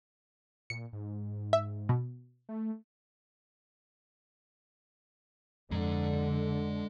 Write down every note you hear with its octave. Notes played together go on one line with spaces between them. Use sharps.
A#2 C#7
G#2
E5
B2
A3
F2 D3 G#3 A#5